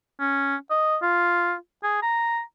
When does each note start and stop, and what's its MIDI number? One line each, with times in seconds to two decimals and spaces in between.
0.20 0.56 61
0.70 0.97 75
1.02 1.54 65
1.83 1.97 68
2.02 2.41 82